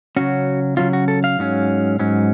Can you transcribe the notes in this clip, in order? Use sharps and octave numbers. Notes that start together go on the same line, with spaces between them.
C#3 F#3 C#4 F#4
C#3 F#3 C#4 F4
F#4
A4
F5
G#2 F#3 C#4
G#2 F#3 C#4